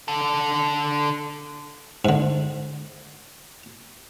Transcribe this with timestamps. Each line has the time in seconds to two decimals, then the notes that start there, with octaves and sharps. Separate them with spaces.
0.08 D3 A4
2.05 G#2 D3